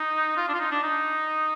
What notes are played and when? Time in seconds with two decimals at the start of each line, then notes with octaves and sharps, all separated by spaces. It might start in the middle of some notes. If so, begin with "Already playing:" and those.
Already playing: D#4
0.37 F4
0.48 D4
0.54 F4
0.60 D#4
0.71 D4
0.83 D#4